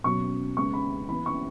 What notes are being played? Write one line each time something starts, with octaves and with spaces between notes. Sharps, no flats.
B2 F#3 C#4 C#6
C#3 G#3 B3 C#6
B5
E3 B3 B5
C#6